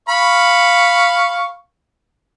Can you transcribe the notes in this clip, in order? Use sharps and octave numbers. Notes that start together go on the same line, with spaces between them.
F5 B5 C#6